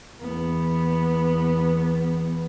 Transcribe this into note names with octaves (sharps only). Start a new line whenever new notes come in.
E2 B3